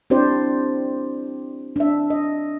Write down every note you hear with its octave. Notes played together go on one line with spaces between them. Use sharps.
C4 D4 E4 G4 C5 D5
D4 E5
D#5